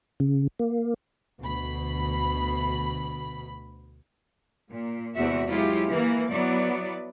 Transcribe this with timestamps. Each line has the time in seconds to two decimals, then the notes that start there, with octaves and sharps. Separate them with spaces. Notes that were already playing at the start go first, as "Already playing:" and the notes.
0.20 C#3
0.59 A#3
1.40 D2 B2 B5
4.71 A#2
5.15 E2 C3 G#3 F#4 E5
5.47 F#3 G#3 E4 F4 G4
5.91 E3 A#3
6.28 F#3 B3 E4 D5